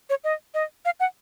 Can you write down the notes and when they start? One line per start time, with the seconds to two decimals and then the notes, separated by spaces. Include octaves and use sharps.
0.10 C#5
0.24 D#5
0.54 D#5
0.85 F5
1.00 F#5